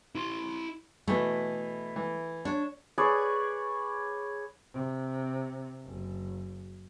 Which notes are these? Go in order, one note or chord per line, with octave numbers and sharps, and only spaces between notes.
E4 C6
B2 E3 A3 B3
E3
D4 C#5
G#4 B4 C#5 D5
C3
F#1